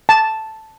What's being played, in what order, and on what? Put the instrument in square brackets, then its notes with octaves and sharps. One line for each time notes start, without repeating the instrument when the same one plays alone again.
[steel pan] A5